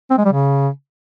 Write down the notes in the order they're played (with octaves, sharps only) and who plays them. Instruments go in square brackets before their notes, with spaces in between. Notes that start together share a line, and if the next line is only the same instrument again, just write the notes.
[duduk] C4
G#3
G3
C#3